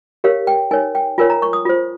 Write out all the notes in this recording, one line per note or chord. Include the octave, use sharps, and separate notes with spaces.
G4 A#4 C#5 F5
G5
D#4 A#4 C#5 G#5
G5
F4 A#4 C#5 G#5
A#5
C#6
D#6
F4 C5